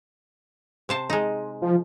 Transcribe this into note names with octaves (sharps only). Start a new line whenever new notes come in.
C3 C5 A5
G#3 D#4
F3